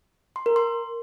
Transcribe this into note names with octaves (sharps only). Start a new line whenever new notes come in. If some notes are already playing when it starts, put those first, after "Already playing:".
C6
A#4
C6